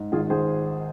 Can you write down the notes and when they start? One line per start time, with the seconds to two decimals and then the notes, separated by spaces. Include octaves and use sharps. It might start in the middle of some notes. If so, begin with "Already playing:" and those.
Already playing: G#2
0.12 G#1 F4 G#4
0.30 G#1 G#4 C5